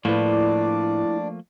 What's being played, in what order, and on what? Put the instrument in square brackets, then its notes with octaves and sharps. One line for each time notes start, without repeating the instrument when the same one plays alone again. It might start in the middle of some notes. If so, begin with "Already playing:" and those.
[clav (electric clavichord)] A2 B4 [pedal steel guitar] F3 A3 A#3 [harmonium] D4 D5 [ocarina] E4